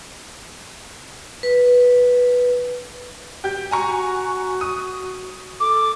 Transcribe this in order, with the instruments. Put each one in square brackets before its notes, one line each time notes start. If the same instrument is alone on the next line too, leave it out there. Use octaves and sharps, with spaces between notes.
[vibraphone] B4
[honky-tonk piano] G4 G6
[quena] F#4 [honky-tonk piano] G#5 A#5 C#6
[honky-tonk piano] D#6
[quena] A4 [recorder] D6